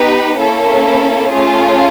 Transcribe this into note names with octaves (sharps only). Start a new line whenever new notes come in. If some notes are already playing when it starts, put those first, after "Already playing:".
Already playing: B3 D#4 G4 B4
A#3 C#4 E4 A4
A3 C#4 F4 G#4